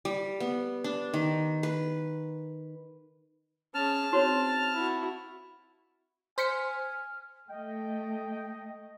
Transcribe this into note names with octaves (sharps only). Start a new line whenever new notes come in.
G3
B3
D4
D#3
B4
C#4 G#4 A5 F6
C4 D#4 F#4 C#5
E4 F#4
C5 G#5 F6 B6 C#7
A3 D#5 G5